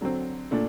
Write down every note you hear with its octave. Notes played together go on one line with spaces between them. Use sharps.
D3 F#3 C4
A#2 A3 D4